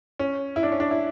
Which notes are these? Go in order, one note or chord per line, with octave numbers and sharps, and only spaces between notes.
C#4
E4
D4
C#4
D4
E4